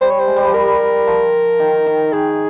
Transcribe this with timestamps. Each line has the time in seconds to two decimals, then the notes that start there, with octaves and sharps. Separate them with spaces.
0.01 G3 C5
0.11 C#5
0.20 C5
0.28 G#3
0.36 G3
0.45 F3
0.54 G3 A#4
1.07 F3
1.60 D#3
1.87 D#3
2.13 D#3 G#4